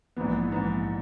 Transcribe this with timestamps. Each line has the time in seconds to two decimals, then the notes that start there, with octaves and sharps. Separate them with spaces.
0.16 A#1 G#2 E3 B3
0.52 A#1 G#2 E3 B3